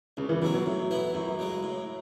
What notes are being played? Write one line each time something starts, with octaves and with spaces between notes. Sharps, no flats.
C#2 C#3
E3
B2 F#3 G#3 C#4
F#3
A2
E3 B3 E4
F#2 F#3
C#3 G#3
A2